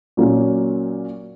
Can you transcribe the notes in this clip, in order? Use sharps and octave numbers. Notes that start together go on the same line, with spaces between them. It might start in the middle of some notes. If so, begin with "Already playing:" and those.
A#2 F#3 A#3 C#4